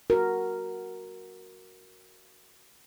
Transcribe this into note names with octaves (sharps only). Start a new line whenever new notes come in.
F#4 A#4